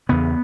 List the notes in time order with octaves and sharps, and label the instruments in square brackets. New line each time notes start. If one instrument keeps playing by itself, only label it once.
[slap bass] E2 C#3 B3